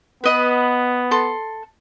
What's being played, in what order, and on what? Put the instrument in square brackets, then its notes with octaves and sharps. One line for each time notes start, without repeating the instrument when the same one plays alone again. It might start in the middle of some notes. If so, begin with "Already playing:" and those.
[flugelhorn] B3 [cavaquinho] B4 D#5 F#5
[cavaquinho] A4 C6